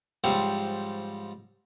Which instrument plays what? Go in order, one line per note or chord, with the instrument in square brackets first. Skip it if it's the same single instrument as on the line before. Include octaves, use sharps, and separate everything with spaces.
[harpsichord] G#2 F3 G3 C4 C#5